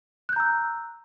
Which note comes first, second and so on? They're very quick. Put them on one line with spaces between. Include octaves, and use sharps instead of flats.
F#6 G6 A#5 E6